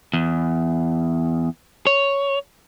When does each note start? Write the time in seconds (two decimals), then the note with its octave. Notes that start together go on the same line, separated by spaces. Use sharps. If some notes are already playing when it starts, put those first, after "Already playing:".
0.13 E2
1.87 C#5